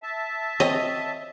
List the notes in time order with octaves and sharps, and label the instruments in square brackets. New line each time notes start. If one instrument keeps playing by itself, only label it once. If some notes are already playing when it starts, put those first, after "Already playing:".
[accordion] E5 A5
[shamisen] C4 C#5 [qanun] D#5